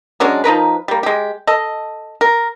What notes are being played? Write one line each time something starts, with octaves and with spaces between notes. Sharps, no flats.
F#3 G#3 C#4 D4
F3 D#4 A#4 B4
G3 A#3
G#3 G4
A4 D#5
A#4